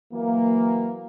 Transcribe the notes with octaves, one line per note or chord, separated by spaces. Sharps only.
E3 F#3 A#3